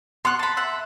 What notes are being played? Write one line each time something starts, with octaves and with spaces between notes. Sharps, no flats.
B3 C6 C#6 F#6
A5 B5
E5 F#5